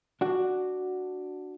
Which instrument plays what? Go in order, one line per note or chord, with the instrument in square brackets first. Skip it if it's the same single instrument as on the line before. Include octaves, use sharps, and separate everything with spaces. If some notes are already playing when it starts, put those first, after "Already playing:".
[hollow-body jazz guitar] D4 F#4